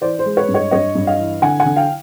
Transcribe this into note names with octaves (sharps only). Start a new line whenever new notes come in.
E3 C5 D5
C5
G#3
B4 C#5
G2
C#5 D#5
G2 C#5 D#5
G2
D#5 F5
E3
D3 F#5 G#5
F#5 G#5
D3
F5 G5